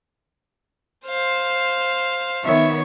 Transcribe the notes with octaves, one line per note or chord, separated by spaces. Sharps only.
C5 F5
D#3 B3 C#5 E5